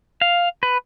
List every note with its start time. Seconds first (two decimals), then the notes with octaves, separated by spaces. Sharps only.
0.21 F5
0.63 B4